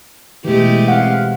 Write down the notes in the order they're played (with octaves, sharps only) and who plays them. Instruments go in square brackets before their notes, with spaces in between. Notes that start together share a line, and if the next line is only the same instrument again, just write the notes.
[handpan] B2 E3 [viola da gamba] G#3 A3 G4
[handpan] C4 F5 F#5